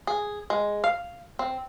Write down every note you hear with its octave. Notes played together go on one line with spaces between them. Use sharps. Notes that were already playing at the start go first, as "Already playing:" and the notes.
G#4
G#3
F5
C4